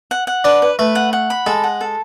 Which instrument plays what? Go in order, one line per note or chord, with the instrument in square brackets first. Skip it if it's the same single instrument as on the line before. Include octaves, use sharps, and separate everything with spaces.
[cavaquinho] F#5
F#5
[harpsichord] D4 [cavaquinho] B4
[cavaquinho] B4
[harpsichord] A3 [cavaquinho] B4
[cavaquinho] F#5
F#5
B5
[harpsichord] G#3 [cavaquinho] A4
[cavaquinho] F#5
A4